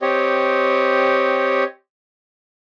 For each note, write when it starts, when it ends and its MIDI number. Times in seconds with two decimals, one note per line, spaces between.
0.02 1.64 60
0.02 1.64 67
0.02 1.64 73
0.02 1.64 75